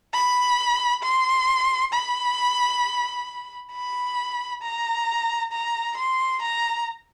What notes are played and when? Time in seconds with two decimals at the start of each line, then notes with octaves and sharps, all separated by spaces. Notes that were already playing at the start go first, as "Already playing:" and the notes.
0.14 B5
1.03 C6
1.93 B5
3.72 B5
4.62 A#5
5.52 A#5
5.97 C6
6.42 A#5